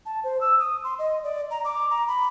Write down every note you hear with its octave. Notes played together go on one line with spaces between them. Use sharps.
A5
C5
E6
D#6
C6
D#5
D5
A#5
D6
A#5
B5